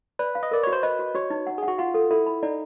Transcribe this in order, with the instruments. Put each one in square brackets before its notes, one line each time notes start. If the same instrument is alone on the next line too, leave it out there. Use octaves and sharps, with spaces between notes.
[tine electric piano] B4 [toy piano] D5
[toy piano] F5
[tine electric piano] D#5
[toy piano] A#4 [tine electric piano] D5
[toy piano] F#4 [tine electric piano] C#5
[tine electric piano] C5
[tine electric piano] B4 [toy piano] D#5
[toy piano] F#4
[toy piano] F#4 [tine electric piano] C#5
[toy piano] D#4
F#5
[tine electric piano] G#4 [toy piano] F#5
[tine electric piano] F#4
[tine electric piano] F4 [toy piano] F#5
[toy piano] A4
[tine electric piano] E4 [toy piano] A4
[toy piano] B5
[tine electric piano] D#4 [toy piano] D5